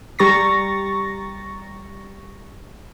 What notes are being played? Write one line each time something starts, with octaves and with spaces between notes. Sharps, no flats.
G3 G4 A#5 C#6 A6 A#6